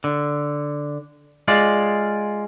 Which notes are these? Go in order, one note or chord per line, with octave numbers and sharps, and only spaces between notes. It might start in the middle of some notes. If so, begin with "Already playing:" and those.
D3
G#3 F4 D5